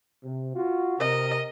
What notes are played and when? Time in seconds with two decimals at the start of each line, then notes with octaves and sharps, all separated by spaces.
0.24 C3
0.55 F4 F#4
0.99 C3 A#4 D#5